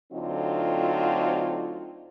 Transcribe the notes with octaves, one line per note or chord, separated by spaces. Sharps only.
D2 D3 F#3 C4 D#4 F4